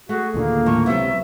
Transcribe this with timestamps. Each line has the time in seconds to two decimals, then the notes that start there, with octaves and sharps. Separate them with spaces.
0.09 A3 F#4 G#4
0.34 D#2 A#2 D3 A#3
0.66 A2 F3 C#6
0.86 C#2 C3 F#3 B3 E5